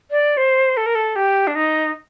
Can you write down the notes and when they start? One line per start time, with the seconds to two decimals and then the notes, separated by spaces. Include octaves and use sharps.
0.11 D5
0.37 C5
0.77 A4
0.86 A#4
0.95 A4
1.16 G4
1.47 D4
1.55 D#4